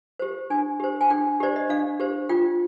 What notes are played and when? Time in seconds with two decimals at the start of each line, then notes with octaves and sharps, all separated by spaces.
0.19 G4 C5
0.50 D4 G#5
0.80 G4 C5
1.01 G#5
1.10 D4 G5
1.40 G4 C5 D5
1.56 D#5
1.69 D4 F5
2.00 G4 C5
2.29 F4 G5